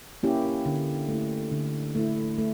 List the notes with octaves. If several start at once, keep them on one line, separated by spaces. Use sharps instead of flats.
A#3 C#4 E4 G4
D3
A3
E4
D3
A3 E4
A3